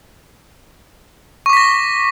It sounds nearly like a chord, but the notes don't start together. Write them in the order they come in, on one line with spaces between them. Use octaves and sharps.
C#6 D6 B6 A#6